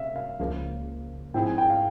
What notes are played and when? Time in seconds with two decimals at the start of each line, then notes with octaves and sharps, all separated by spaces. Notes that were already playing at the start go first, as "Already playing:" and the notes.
Already playing: C3 C#4 E5 F5
0.16 F5
0.39 C#2 C#3 F3 A#3
1.34 G#2 F3 C4 E4 G#4 G5
1.46 G#5
1.58 G5
1.70 F5